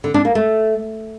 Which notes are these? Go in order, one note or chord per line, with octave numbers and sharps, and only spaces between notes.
D3
D4
A#3
A3